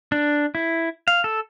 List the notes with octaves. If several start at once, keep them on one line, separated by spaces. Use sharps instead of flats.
D4
E4
F5
A4